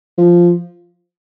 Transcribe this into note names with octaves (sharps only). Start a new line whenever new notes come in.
F3